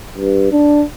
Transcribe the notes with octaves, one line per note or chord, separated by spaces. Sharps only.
G2
D4